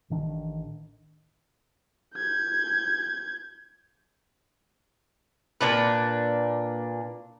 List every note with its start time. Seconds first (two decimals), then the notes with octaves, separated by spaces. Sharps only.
0.10 A1 D#3 D4
2.16 G6 G#6
5.61 A#2 D4 B4